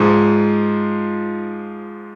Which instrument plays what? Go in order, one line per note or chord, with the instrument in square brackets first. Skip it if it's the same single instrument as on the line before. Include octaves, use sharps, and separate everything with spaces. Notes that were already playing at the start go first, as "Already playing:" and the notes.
Already playing: [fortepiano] G#2 F3 G#3 [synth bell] D#4 F4